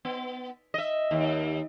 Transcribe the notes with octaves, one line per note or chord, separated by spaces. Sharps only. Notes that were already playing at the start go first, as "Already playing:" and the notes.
B3
D#5 E5
D#2